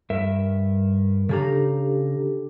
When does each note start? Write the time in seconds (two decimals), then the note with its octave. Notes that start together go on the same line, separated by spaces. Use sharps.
0.10 G2 A#4 E5
1.29 C#3 D4 G4 A4 G#5 A#5